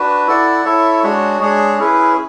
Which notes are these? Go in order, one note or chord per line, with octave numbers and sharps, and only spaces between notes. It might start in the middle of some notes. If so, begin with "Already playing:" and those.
Already playing: D4 F#4 B4
E4 A4 D5 F#5
E4 A4 C#5 E5
G#3 D4 F#4 C#5
G#3 D4 G#4 C#5
C#4 E4 G#4 B4